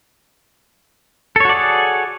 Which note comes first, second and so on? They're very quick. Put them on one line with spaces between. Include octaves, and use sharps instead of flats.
A4 C#5 F#4 D5 G#4